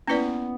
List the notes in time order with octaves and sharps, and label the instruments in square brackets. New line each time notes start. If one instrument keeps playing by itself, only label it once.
[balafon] A#3 C#4 E4 B4 D5 [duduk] B3